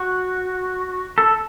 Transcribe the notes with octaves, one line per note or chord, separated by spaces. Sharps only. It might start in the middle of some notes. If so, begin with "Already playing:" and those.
Already playing: F#4
A4